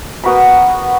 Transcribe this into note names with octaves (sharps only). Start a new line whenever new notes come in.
B3 F#4 A#4 B5